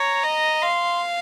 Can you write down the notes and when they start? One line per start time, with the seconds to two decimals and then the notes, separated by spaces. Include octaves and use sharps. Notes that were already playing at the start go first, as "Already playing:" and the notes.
Already playing: C#5 A#5
0.23 D#5
0.62 F5 C6